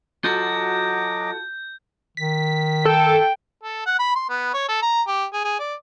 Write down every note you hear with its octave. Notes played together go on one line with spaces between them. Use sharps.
F#3 F4 F#4 A4 D#5 D6 G6
D#3 B6
A4 G5
A4
F#5
B5
C6
B3
C#5
A4
A#5
G4
G#4
G#4
D5